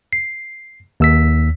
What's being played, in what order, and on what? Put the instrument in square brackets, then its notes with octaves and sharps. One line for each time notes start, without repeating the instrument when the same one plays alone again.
[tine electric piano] C7
D#2 E6 B6